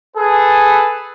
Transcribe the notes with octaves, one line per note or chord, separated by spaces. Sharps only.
G#4 A4 B4